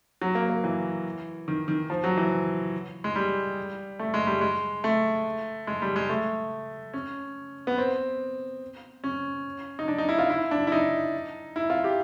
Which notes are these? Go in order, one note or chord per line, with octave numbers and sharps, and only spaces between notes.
F#3
A#3
A#3
E3
D#3
D#3
F3
F#3
E3
G#3
G3
A3
G#3
G3
G#3
A3
G#3
G3
G#3
A3
C#4
B3
C4
C#4
D#4
D4
D#4
E4
F4
E4
D4
E4
D#4
E4
F4
G4